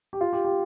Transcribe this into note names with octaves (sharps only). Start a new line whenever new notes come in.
G4
F4
G4
G4